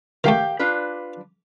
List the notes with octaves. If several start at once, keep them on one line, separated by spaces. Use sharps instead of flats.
D#3 A3 G4 F5 G5
D4 F4 B4